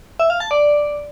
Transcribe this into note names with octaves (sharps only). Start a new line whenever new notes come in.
E5
F5
A5
D5